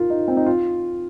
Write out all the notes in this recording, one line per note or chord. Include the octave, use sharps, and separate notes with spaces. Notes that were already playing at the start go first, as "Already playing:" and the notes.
Already playing: F4 A#4
D#4
C4
D#4
F4